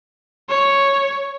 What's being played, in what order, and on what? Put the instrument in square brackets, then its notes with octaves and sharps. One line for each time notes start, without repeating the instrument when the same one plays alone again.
[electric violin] C#5